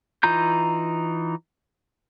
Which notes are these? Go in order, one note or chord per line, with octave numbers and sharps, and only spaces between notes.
E3 D#4 F4 A#5 G6